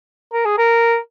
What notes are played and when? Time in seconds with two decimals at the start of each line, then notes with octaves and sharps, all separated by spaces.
0.33 A#4
0.46 G#4
0.58 A#4